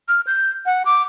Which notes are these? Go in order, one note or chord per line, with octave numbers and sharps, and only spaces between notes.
F6
G6
F#5
D6